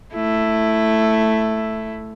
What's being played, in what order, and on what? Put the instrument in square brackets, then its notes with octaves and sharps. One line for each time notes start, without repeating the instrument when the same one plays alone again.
[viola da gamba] A3 E4